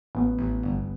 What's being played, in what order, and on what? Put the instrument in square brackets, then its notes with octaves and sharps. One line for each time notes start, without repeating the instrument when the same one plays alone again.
[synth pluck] A1 [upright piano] B3
[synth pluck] A1
G1